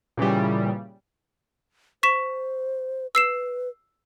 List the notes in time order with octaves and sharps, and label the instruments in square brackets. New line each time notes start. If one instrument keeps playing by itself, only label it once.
[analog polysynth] A#2 C#3 E3 G3
[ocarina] C5 [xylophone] C#6 B6 E7
[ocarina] B4 [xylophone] E6 C7 E7